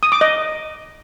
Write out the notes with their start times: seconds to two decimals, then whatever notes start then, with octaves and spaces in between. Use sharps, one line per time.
0.03 D#6
0.12 D6
0.21 D#5